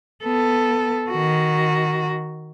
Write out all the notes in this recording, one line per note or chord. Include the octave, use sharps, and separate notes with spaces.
B3 A4
D#3 F#4